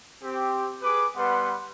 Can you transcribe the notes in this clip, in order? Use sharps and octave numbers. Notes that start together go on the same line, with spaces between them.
C4 G4
G#4 B4 D6
G3 B3 B4 F#5 C6